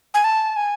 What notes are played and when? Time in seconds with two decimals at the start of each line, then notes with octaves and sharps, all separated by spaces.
0.14 G#5
0.24 A5
0.56 G#5